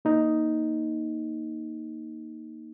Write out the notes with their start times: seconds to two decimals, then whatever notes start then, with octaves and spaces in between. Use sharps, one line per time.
0.05 A#3 D#4